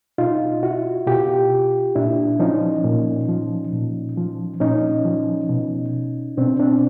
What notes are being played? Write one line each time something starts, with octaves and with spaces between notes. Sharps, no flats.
B2 D#4 F4
E4 F#4
B2 F4 G4
A#2 D4 E4
F3 C#4 D#4
A#2
F3
A#2
F3
A#2 C#4 D#4
F3
B2
B2 C4 D4
C4 D4